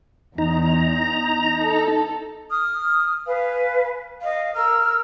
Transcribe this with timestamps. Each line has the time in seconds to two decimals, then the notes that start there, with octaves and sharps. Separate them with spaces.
0.38 E2 D#4 A#5
1.60 A4
2.51 D#6 F6
3.26 B4 F5 G#5
4.22 D#5 F5
4.55 A#4 E6 F6